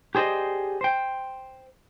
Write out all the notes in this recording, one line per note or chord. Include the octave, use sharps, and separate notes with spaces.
G4 G#4 C5 D5 D#5
C5 G5